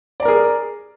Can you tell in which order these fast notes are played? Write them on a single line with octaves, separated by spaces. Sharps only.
D5 A#5 A#4 G#4